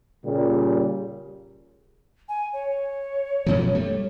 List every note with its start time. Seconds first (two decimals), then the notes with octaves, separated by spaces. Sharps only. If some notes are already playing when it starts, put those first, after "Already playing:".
0.25 A#2 C#3 G3
2.29 G#5
2.53 C#5
3.46 F#2 B2 F3
3.75 G3 A3